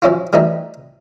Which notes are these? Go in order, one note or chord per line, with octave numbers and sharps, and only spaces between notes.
F3 F#3 C#4 E4 F4
E3 F#3 G3 A3 D#4